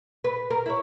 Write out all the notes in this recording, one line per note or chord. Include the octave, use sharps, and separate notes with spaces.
B4
A#4
E4 C#5